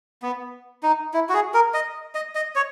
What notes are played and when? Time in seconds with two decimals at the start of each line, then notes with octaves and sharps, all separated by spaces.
0.22 B3
0.83 D#4
1.14 E4
1.29 F#4
1.34 G#4
1.54 A#4
1.74 D#5
2.15 D#5
2.35 D#5
2.56 C#5